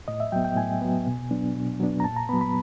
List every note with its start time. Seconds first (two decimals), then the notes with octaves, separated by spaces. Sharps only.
0.08 A2 D#5
0.20 E5
0.32 F#3 G5
0.36 B3
0.45 G5
0.57 A2 G#5
0.81 F#3 B3
1.06 B2
1.31 F#3 B3 D4
1.56 B2
1.80 F#3 B3 D4
2.00 A#5
2.04 A#2 A5
2.17 A#5
2.29 B3 B5
2.33 F#3
2.41 B5